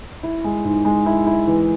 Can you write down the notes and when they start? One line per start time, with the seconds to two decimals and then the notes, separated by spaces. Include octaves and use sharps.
0.23 E4
0.44 G#3
0.65 G#2
0.85 G#3
1.06 E4
1.27 E4
1.47 E3